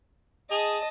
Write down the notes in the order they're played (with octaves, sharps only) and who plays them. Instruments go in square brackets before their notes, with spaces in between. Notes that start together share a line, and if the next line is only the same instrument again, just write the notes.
[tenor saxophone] G#4 [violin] D#5 A5